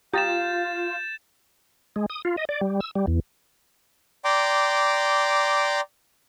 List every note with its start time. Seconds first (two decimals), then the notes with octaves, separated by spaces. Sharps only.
0.14 F4 G4 F5 A#5 D#6 G6 A6 E7
1.96 G#3
2.10 D#6
2.25 F4
2.37 D#5
2.49 D5
2.61 G3
2.80 E6
2.95 G3
3.07 E2
4.25 D5 G5 A#5 C6 D6